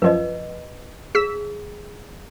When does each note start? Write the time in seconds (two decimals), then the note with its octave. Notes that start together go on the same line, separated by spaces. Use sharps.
0.02 F#2 F3 B4 D#5
1.15 G#4 E6 B6